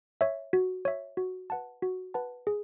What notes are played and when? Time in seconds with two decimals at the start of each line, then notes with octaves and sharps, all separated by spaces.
0.21 C#5 E5
0.53 F#4
0.85 C#5 E5
1.17 F#4
1.50 B4 F#5 A5
1.82 F#4
2.14 B4 F#5 A5
2.47 G#4